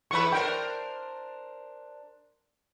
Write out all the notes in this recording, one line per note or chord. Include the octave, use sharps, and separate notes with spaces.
E2 E4 B4 B5 C#6
D4 A#4 C5 G5